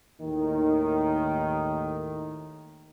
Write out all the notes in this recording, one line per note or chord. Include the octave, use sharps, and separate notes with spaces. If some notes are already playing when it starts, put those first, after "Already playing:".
D#2 A2 D#3